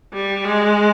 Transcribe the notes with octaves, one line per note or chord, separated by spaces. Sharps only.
G3
G#3